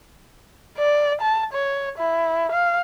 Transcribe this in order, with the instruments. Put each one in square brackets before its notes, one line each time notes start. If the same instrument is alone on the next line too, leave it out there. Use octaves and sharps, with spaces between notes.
[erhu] D5
A5
C#5
E4
F5